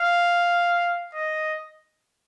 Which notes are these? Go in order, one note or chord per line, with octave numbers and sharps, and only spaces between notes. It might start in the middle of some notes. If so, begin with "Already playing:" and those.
Already playing: F5
D#5